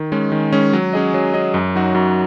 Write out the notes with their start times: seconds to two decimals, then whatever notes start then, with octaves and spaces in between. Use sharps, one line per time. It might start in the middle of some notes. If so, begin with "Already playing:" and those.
Already playing: D#3
0.12 G#3 C#4
0.32 D#3
0.52 G#3 C#4
0.73 F#3
0.93 C#4 G#4 D#5
1.14 F#3
1.34 C#4 G#4 D#5
1.54 F#2
1.75 F#3 D#4 F#4
1.95 F#2